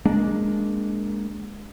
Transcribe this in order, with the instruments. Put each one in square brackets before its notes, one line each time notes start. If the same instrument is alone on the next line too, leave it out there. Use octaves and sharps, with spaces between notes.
[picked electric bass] G#3 A#3 D4